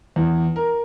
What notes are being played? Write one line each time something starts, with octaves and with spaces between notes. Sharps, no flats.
E2
A#4